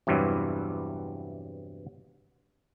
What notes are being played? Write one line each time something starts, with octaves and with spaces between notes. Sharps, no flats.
E2 G2 C3 E3 F#3 G3